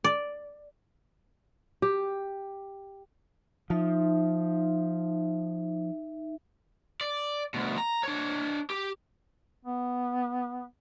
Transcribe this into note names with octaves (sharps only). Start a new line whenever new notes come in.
D5
G4
F3 D#4 E5
D5
D2 B2
A#5
D4 C#5
G4
B3